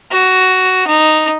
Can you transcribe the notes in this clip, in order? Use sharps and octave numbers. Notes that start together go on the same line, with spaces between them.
F#4
D#4